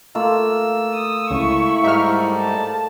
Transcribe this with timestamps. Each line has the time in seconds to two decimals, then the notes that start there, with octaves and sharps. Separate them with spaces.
0.15 A3 A#3 F4 E6
0.93 D#6
1.30 C#2 E4 C#6
1.83 G#2 G3 D#4 E5 F6
2.37 A5